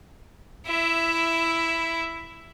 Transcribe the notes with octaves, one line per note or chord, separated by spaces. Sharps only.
E4 E5